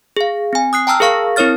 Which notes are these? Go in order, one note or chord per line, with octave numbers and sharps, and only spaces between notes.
G#4 F5
C4 G#5
D#6 F#6 C7
G5 A5 A#5 E6 F6
G#4 A#4 F5 C#6 A#6
C4 E4 A#4 C#5 F6 A6